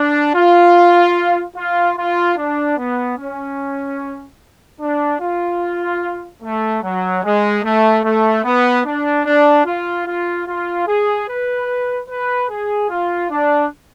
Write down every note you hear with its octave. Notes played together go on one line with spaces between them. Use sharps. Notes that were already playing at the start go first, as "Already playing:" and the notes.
Already playing: D4
F4
F4
F4
D4
B3
C#4
D4
F4
A3
F#3
G#3
A3
A3
B3
D4
D4
F4
F4
F4
G#4
B4
B4
G#4
F4
D4